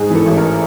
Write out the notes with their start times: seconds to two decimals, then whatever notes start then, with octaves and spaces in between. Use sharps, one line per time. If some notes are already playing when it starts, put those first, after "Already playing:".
Already playing: G#2 G#4
0.10 E3
0.15 A4
0.26 A1
0.37 A#4